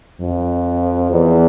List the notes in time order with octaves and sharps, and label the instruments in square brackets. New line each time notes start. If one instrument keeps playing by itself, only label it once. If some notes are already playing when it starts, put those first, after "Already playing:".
[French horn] F2
E2